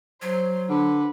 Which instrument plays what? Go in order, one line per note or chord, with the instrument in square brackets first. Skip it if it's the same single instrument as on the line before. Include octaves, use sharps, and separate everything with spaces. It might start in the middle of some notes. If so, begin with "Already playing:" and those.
[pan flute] F#3 [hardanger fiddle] C5
[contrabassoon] D3 [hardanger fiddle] B4